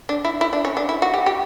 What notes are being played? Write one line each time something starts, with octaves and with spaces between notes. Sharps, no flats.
D4
E4
E4
D4
C#4
D4
E4
F#4
G4
G4